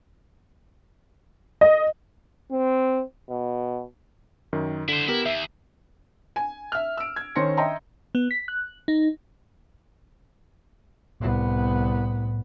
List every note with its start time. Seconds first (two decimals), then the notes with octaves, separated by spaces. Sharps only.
1.61 D#5
2.51 C4
3.30 B2
4.53 F#2 D#3
4.88 D3 E4 C5
5.08 B3 E4 G4 A#4
5.26 D#2 E5
6.36 G#5
6.72 E5 F6
6.97 E6 D7
7.16 G#6
7.35 D#3 C#4 C5 C6 A#6 C#7
7.57 D#5 E5 G5 A#5 C6
8.15 B3
8.31 B6
8.48 F#6
8.88 D#4
11.20 C2 A2 B3